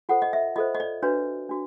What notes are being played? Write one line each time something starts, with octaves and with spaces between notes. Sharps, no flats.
F4 A4 C5 F#5
D#5
E5
F4 A4 C5 D#5
D#5
D5
D4 F#4 B4 C#5
D4 F#4